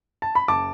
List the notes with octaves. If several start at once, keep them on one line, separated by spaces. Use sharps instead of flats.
A5
B5
F#1 A5 D6